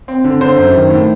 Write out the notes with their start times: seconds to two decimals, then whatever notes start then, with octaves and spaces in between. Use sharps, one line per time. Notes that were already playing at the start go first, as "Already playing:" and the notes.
0.08 C4
0.24 D3
0.41 D3 C5
0.57 F#2
0.74 D#3
0.90 A2